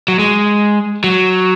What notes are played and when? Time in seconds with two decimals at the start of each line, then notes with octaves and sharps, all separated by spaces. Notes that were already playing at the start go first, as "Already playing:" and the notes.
0.08 F#3
0.19 G#3
1.04 F#3